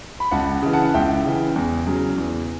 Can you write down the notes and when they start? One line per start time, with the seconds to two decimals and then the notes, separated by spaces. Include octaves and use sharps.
0.20 B5
0.31 C#2 F#5 A5
0.62 C#3 E3
0.73 F#5 A5
0.85 F#5
0.94 C#2 E5 G5
1.25 C#3 E3
1.56 E2
1.87 C#3 F#3
2.18 E2